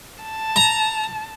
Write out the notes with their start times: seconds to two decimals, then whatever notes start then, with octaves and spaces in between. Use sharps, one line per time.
0.24 A5
0.56 A#5